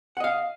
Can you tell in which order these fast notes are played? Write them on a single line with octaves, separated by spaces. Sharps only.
F#5 D#5 F5